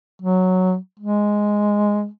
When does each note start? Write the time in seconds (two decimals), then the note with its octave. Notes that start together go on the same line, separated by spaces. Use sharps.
0.22 F#3
1.00 G#3